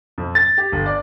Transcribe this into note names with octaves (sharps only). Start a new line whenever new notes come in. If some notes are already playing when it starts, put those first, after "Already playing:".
F2
A6
G4
G1
D5